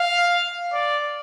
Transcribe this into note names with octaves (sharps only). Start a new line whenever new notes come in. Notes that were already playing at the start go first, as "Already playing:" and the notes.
Already playing: F5
D5